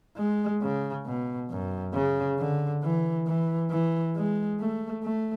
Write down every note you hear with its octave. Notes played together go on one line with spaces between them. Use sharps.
G#3
C#3
B2
F#2
C#3
D3
E3
E3
E3
G#3
A3
A3